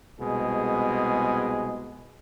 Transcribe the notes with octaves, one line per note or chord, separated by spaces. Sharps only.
C2 B2 G#3 G#4